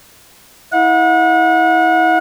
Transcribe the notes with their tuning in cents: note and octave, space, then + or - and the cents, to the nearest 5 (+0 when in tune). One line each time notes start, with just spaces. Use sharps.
E4 -25 F#5 -35